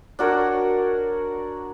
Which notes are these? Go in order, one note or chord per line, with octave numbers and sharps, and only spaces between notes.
D4 F#4 A#4 C#5